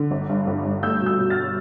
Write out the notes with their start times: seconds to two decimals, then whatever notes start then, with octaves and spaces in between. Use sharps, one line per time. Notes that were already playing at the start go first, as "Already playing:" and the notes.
Already playing: D3
0.11 G1
0.29 G2
0.47 G1
0.65 G2
0.83 A3 E6 G6
1.02 B2 E6 G6
1.19 B2
1.30 F6 A6